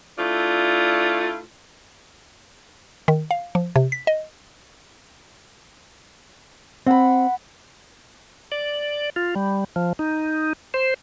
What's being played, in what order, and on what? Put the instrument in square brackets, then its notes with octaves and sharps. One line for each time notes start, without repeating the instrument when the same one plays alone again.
[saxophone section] A3 D4 E4 F4
[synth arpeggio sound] D#3
F5
F3
C3
B6
D#5
[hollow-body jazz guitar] C4 [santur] F#5 B5
[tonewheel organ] D5
F4
G3
F3
D#4
C5